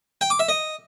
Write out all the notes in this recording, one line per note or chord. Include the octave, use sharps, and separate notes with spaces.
G5
D6
E5
D#5